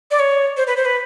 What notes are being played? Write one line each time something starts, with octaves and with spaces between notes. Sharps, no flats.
D5
C#5
C5
B4
C5
B4